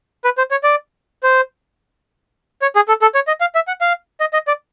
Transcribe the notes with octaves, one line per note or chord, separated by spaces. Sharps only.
B4
C5
C#5
D5
C5
C#5
G#4
A4
A4
C#5
D#5
F5
E5
F#5
F5
D#5
D#5
D5